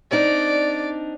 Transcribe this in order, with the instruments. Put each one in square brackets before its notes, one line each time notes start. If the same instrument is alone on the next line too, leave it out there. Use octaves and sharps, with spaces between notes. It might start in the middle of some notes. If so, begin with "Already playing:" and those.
[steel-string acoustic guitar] C4 D4 D#4 [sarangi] D5